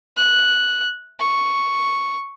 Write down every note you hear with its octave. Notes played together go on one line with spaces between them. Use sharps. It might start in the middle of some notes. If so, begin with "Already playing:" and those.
F#6
C#6